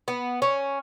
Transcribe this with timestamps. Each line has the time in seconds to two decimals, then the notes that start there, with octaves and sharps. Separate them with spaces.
0.08 B3
0.42 C#4